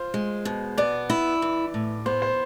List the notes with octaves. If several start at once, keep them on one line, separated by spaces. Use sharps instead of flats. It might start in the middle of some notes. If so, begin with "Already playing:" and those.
Already playing: F4 C5
G#3
B2
B3 D5
E4
E3
A2
B3 C5
C5